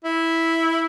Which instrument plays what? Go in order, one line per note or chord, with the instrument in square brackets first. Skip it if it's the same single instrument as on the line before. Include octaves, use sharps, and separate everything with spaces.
[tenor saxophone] E4